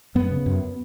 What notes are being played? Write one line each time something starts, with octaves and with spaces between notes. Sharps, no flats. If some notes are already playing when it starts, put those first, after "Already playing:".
F#2 B3
C#3
F#2